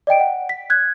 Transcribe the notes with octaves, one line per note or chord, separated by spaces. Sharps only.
D5 D#5 G5 D7
F#5
B6
F#6 G#6